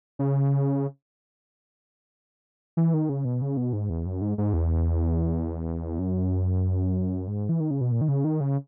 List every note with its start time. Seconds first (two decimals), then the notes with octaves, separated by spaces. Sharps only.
0.19 C#3
2.77 E3
2.94 D#3
3.09 C#3
3.25 B2
3.42 C#3
3.57 B2
3.73 G#2
3.90 E2
4.06 F#2
4.21 G#2
4.38 G#2
4.53 E2
5.99 F#2
7.28 G#2
7.49 E3
7.60 D#3
7.71 C#3
7.81 B2
7.92 A#2
8.01 D#3
8.08 C#3
8.24 D#3
8.40 C#3